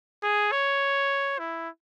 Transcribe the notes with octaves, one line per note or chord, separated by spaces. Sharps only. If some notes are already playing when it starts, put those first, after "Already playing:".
G#4
C#5
E4